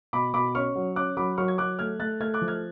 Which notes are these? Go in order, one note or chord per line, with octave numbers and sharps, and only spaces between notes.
B2 B5 D6
B2 B5 D6
C#4 C#6 F6
F#3
C#4 D6 F#6
F#3 B5 D6
F#3 C#6 F6
G#6
F#3 D6 F#6
A3 F6 G#6
A3 F#6 A6
A3 F6 G#6
D6 F#6
F3
F6 G#6